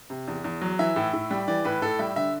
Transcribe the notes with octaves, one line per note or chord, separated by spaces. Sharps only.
C3
E2
E2
F#3
E3 E5
A2
A2
G3
E3 D5
A2 B4
A2 A4
G3 E5
D3 E5